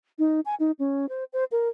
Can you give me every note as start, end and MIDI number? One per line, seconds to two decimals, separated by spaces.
0.19 0.40 63
0.45 0.55 80
0.60 0.71 63
0.79 1.09 61
1.09 1.24 72
1.33 1.44 72
1.52 1.68 70